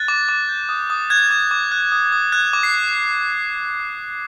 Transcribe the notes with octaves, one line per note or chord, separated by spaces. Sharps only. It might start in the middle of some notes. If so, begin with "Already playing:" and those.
Already playing: F#6 A6
D6
D6
G6
D#6
D#6
F#6 G#6
D6
D6
F#6
D#6
D#6
F#6 G#6
D6
C7